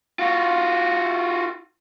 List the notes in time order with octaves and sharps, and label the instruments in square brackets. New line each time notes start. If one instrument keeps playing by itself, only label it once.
[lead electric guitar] F4 F#4